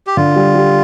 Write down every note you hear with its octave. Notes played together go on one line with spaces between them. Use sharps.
G4
D3 F4
G3
G3